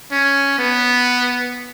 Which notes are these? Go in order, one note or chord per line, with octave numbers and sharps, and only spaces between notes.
C#4
B3